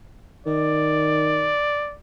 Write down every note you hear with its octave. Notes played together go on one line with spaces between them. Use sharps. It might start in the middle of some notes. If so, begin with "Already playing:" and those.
D#3 D5